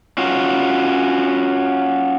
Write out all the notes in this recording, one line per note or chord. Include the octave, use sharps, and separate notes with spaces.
C#4 F4 F#4